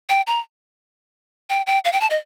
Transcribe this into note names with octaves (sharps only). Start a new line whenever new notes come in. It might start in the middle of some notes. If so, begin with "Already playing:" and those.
G5
A#5
G5
G5
F5
G5
A5
D#5